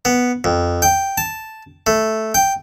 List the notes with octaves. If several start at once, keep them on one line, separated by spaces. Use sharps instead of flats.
B3
F2
G5
A5
A3
G5